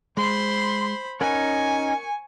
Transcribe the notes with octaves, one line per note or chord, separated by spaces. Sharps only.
G#3 C5 B5 C6
C#4 D#4 A#4 F#5 G#5 B5 C#6